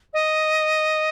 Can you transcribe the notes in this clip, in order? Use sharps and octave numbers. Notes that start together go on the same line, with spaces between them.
D#5